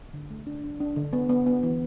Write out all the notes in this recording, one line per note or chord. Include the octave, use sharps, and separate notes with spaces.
D3
A3
D4
D4
D4
D3
B3
B3
B3
E3